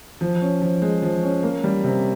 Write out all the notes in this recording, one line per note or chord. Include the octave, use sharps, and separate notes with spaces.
F3
C#4
F3
G#3
F3
C#4
A#3
G3
C3